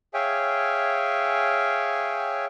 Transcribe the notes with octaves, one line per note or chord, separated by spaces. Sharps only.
G#4 C#5 E5 F5 G5 G#5